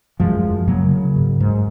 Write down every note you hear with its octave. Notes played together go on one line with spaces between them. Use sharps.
F#2 F3 G#3
F#2
C#3 F#3 A#3
C#3
G#2
G#2